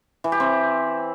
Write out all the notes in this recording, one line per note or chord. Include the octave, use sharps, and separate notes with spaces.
E3
G4
C4